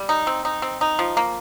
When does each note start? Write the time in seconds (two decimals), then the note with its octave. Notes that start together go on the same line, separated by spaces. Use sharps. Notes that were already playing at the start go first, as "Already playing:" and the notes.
Already playing: G3
0.09 D#4
0.27 C4
0.45 D#4
0.62 C4
0.81 D#4
0.99 F3
1.17 A#3